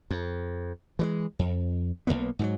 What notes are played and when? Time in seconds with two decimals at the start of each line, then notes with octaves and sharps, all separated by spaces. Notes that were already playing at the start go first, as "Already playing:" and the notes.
0.11 F2
0.99 E3 F#3 G#3
1.39 F2
2.07 B1 F2 A#3 B3
2.39 G#2 E3 F#3